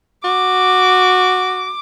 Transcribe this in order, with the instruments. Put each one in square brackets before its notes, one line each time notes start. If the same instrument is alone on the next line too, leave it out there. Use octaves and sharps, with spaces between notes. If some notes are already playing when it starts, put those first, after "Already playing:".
[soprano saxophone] F#4 [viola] D6